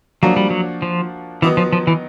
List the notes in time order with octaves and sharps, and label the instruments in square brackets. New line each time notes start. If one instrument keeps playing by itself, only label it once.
[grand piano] F3 A#3 D4 F#4 [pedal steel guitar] F#3
[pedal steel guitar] G3
F#3
F3
[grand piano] D#3 F#3 B3 D#4 [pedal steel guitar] E3
[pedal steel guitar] F3
F3
E3